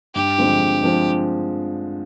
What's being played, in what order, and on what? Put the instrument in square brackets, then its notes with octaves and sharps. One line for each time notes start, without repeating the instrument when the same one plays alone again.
[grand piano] G2 [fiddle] G4
[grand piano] D3 F3 G#3 C4
G2
D3 F3 G#3 C4